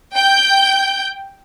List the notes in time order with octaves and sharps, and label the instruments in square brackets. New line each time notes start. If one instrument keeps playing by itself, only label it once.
[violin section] G5 G6